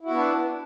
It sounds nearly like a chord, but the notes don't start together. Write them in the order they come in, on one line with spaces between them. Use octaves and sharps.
E4 F#4 B3 D4